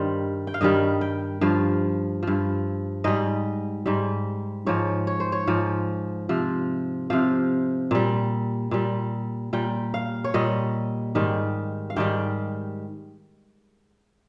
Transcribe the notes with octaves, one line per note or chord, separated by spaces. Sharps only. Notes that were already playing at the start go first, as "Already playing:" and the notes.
Already playing: G2 D#3 G3 C5
G5
F5
G2 D#3 G3 D#5
G5
G2 F3 F5
G2 F3
G#2 G3 D#5
G#2 G3
G#2 F3 C#5
C#5
C5
C#5
G#2 F3
C3 F3
C3 F3 F5
A#2 G3
A#2 G3
A#2 G3 G5
F5
C#5
A#2 G3 D#5
G#2 D#3 G3
F5
G#2 D#3 G3 G5